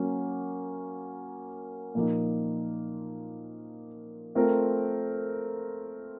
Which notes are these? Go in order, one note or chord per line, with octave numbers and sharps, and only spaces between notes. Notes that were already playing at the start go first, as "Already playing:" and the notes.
Already playing: F#3 A#3 C#4
A#2 F3 A#3 D#4
A3 C4 F4 A#4